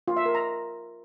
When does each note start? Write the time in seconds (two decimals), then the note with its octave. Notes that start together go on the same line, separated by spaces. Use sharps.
0.08 F4
0.17 E5
0.26 A#4
0.35 A#5